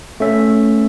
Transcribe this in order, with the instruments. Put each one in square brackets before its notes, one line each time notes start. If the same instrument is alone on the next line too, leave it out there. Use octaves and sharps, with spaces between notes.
[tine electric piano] A3 C#4 E5